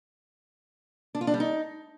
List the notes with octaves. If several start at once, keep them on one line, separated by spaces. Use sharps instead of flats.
D4
F4
D4
G3
D#4